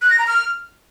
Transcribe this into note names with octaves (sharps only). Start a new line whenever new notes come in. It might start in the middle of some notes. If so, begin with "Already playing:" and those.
F#6
A#6
A#5
F6